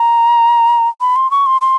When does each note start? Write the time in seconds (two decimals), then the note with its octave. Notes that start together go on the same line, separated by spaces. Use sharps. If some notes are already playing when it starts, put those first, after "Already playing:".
Already playing: A#5
1.01 B5
1.16 C6
1.31 C#6
1.46 C6
1.61 C6